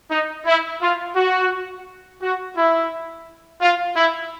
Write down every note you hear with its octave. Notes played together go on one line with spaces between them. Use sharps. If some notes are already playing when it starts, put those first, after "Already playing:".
D#4
E4
F4
F#4
F#4
E4
F4
E4